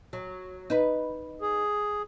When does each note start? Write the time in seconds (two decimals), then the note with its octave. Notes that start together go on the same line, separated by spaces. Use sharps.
0.13 F#3
0.70 D#4 B4
1.42 G#4